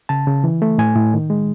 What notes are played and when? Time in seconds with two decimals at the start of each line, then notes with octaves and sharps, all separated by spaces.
0.09 C#3 A5
0.27 C#3
0.44 E3
0.62 A3
0.78 A2 G#5
0.96 A2
1.14 D#3
1.30 G#3